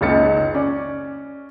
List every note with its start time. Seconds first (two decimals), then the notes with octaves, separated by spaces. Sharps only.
0.01 F#1 C#2 C#3 D#4 A6 C#7
0.54 C#4 D5